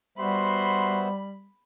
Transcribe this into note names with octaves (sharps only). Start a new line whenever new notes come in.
G3 B3 F#4 C5 E5 B5 C6